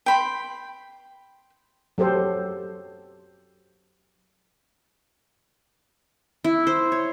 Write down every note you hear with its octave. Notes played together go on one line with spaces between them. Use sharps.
G5 B5 C6
F#3 G4 A4 C5
E4
C5
C#5